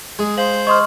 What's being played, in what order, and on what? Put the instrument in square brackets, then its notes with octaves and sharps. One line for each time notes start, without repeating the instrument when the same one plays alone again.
[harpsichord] G#3 [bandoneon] G#4
[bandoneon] C5 [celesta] F5 [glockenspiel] F#7
[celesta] D#5 C6 [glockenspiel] C#6 D#6 F6